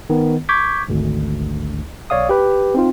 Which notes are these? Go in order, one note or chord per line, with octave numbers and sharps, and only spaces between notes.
D#3 B3
C#6 D6 G6 G#6 B6
G#1 D2
B1 C#5 D5 F5 D#6
G4 B4
C4 D#4 F4